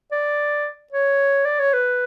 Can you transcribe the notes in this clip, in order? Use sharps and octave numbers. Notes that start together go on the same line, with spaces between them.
D5
C#5
D5
C#5
B4